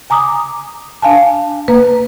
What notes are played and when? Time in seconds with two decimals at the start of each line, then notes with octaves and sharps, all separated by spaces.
0.10 G#5 A#5 D6 D#6
1.02 D4 F5 G#5 A5
1.68 A#3 B4 A#5